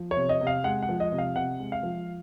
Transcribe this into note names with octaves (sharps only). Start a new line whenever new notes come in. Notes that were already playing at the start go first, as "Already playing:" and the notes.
Already playing: F3
C#5
C3
D#5
C3
F5
G#3 F#5
F#5
F3
D#5
C3
F5
C3 F#5
G#3
F5
F3